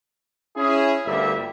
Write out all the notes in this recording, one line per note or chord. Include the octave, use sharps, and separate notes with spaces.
C#4 E4 G#4
G1 D2 G3 A#3 E5